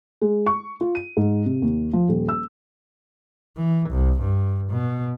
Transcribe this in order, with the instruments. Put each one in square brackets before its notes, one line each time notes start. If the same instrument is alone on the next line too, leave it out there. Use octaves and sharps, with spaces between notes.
[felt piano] G#3
C#6
F4
D#7
G#2
C3
D#2
F3
D#1
E6
[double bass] E3
C2
G2
B2